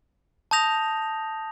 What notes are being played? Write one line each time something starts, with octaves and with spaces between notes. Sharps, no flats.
A5 D#6 G6 A#6 F7